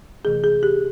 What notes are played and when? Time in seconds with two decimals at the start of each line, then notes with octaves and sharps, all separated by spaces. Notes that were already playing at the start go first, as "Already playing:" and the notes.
0.24 C3 E3 A3 G#4
0.44 G#4
0.63 G4